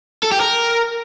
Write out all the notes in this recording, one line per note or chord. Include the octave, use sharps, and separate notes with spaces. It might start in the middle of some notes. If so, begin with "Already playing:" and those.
A4
G4
A#4